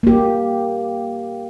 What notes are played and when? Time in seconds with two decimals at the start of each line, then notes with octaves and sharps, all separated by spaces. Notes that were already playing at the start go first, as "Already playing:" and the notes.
0.03 A#3 G4